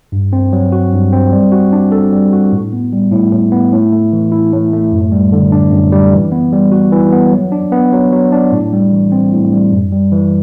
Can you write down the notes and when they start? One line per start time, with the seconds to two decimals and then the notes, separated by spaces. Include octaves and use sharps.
0.12 G2
0.33 C4
0.53 F#3
0.72 F#4
0.93 G2
1.12 C4
1.32 G3
1.52 F#4
1.73 D4
1.92 A4
2.13 G3
2.33 F#4
2.53 A2
2.73 B3
2.93 G3
3.12 A2
3.32 A2
3.52 B3
3.72 A2
3.92 A3
4.13 E3
4.32 E4
4.52 A2
4.73 A3
4.92 F#2
5.12 G3
5.32 D3
5.52 D4
5.72 F#2
5.92 G3
6.13 E3
6.32 B3
6.52 G3
6.72 F#4
6.92 E3
7.12 B3
7.32 F#3
7.52 D4
7.72 B3
7.92 F#3
8.12 F#3
8.32 D4
8.52 A2
8.73 G3
8.92 E3
9.12 C4
9.32 A2
9.52 G3
9.72 F#2
9.92 G3
10.12 E3